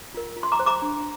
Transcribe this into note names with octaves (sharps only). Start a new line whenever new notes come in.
F4 A#4
F4
C6
A#5 D6
C5
A#5 D6
D4